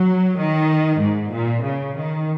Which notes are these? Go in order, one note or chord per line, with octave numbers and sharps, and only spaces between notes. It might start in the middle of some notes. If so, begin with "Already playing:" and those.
Already playing: F#3
D#3
G#2
A#2
C#3
D#3